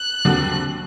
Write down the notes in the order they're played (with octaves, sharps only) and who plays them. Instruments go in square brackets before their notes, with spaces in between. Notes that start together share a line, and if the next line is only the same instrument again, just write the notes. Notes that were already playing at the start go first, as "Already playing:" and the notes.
Already playing: [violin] F#6
[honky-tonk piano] D#2 D3 F#3 C4 F#4